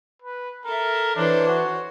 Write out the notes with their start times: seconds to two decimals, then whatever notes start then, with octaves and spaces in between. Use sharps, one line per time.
0.22 B4
0.65 A4 A#4 E5
1.16 E3 D4 C5 C#5
1.48 F#4